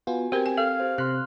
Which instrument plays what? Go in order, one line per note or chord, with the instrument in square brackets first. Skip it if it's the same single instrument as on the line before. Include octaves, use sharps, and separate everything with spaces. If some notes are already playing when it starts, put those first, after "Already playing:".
[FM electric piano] B3 F4 [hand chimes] F#4 G#5
[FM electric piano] C4 G#6 [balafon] G4 A#4 [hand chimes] G5
[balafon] G#5
[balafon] A4 [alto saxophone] F5
[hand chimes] G4 C5
[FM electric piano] C3 F#6 [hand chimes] C6 F6